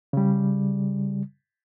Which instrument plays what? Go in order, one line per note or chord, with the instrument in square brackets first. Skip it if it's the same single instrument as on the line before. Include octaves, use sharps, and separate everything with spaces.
[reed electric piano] C#3 G3